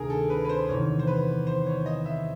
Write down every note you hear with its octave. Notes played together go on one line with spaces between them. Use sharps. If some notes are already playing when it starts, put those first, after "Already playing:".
Already playing: D2 C3 D#3 G#4 A#4
A4
B4
B4
C5
E2 C3 D#3 C#5
C5
B4
C5
C#5
D#5
E5